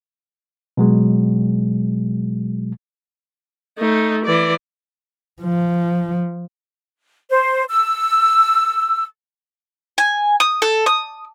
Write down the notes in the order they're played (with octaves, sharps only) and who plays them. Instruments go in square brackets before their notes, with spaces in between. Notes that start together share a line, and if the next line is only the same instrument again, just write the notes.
[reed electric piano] B2 F#3 G#3
[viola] A3 D#4
E3 D5
[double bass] F3
[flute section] C5
E6
[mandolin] G#5
D#6
A4
D#6